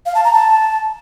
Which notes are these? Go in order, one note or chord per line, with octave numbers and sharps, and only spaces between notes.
F5
A5
A#5
A5